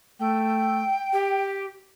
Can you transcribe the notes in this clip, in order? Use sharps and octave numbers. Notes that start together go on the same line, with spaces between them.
A3 G5
G4